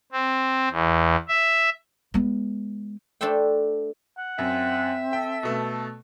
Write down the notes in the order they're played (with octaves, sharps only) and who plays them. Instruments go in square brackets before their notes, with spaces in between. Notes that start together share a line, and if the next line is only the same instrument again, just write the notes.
[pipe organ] C4
E2
E5
[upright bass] G#3 B3
[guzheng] A3 D4 A4 C5 E5 G5
[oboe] F#5
[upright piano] F#2 [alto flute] C4 [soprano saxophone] E5
[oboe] A4 [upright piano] G5
[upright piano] B2 A3